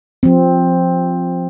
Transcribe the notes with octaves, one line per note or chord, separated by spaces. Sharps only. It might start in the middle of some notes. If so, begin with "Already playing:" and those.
F3 C4